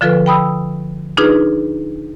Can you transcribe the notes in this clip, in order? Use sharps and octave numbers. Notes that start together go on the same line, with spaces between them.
D3 F3 F4 A4 B4
G5 B5 D#6 E6
D4 D#4 F4 G#4 B4